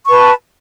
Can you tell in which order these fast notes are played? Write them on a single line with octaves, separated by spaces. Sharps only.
C#6 B4 A5